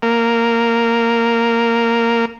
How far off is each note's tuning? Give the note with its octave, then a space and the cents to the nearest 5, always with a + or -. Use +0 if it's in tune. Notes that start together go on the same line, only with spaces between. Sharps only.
A#3 -10